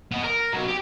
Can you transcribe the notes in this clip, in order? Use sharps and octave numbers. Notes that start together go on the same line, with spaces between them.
B3 D#5
A#4
B2 F#3
G4